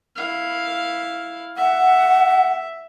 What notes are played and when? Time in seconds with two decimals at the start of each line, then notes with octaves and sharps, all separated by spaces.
0.16 E4 F5
1.57 E5 F#5